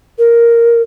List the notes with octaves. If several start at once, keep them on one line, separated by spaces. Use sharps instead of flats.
A#4